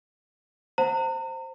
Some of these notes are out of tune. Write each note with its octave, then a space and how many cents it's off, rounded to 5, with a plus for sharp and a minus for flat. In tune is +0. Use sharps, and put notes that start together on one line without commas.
C5 +0 F#5 -15 A#5 -40